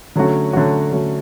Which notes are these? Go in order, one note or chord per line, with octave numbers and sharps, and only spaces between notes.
D3 F#3 A3 C#4 F#4
D3 F#3 A3 C#4 F#4
D3 F#3 A3 C#4 F#4